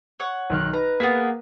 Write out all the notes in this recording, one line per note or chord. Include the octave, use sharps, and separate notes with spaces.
C#5 F#5
B1 D#3 F6 F#6
D#4 B4 A#5
A#3 B3 F#4 G#4 B6